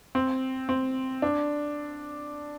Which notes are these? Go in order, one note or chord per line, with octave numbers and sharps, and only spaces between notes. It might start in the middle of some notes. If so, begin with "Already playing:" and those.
C4
C4
D4